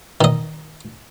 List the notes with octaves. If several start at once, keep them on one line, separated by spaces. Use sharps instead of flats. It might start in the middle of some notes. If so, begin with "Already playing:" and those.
D#3 D#5